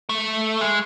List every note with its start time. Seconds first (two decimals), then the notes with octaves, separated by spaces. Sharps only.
0.09 A3
0.61 G#3